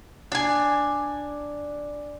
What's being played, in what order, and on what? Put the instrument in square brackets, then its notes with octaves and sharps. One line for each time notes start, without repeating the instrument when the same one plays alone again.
[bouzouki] D4 G#5